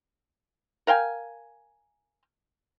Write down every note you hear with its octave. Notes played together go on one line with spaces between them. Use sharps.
A#4 F5 G5 G#5